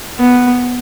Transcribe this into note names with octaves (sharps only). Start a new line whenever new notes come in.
B3